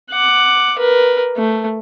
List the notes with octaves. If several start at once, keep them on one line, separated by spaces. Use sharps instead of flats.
F#5 D6
A#4 B4
A3